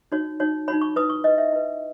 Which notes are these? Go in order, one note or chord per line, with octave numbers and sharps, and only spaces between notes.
D#4 F#4 C#5
D#4 F#4 C#5
D#4 F#4 C#5 B5
C#6
E4 B4 D#6
C#6
E4 B4 D#5
E5
E4 B4